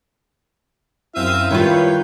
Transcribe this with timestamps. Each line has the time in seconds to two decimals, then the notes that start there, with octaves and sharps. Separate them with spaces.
1.15 F#2 C4 E4 E5 F5 D#7
1.51 D#3 G3 F4 B4 C#5 G5